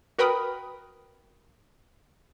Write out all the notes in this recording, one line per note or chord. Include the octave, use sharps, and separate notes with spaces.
F#4 A#4 B4 G5 B5 D#6